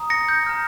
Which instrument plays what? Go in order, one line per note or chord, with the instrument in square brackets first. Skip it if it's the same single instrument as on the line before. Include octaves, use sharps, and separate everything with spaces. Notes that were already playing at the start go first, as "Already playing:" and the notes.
Already playing: [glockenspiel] A#5 D#6
A#6 C#7
G6
A#5 F6